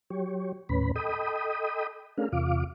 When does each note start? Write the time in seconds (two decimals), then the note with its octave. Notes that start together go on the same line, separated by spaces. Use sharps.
0.10 F#3 G4 C#5
0.69 D#2 A2 C#4 B4 B5
0.96 A4 D#5 G5 B5 D#6
2.18 A3 C#4 D4 G#4 A#4 F5
2.32 E2 C3 F4 F5 D6